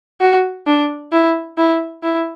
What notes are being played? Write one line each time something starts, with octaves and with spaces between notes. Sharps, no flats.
F#4
D4
E4
E4
E4